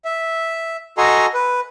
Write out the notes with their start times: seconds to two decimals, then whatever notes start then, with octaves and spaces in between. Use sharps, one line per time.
0.05 E5
0.98 F#4 A4 D#5 G#5 A#5 C6
1.34 B4